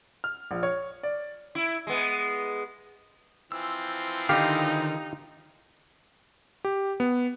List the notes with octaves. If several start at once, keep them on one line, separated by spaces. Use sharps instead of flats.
F6
A#1
C#5
D5
E4
G#3 B3
E3 F3 C4 E6
D3 D#3 D#4 G4 F5
G4
B3